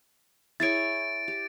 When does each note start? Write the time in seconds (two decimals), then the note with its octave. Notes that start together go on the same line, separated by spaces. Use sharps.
0.60 E4 G#4 C#5 A6 D7
1.28 G4